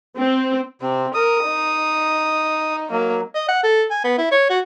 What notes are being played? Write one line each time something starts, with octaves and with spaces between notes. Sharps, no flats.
C4
C3 C4
A#4 D#6
D#4
F#3 A#3
D#5
F#5
A4
G#5
B3
E4
C#5
F#4